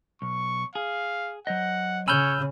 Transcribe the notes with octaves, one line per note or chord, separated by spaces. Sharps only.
B1 C#6
G#4 F5
F#3 C5 D#5 F#5
C#3 C#5 G#5 B5 E6 F6 G6